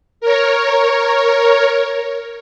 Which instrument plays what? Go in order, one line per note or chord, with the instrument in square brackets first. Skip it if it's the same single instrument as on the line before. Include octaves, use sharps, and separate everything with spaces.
[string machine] A#4 C#5